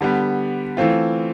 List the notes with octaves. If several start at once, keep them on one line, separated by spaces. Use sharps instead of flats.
D3 G3 B3
E3 A3 C4 F4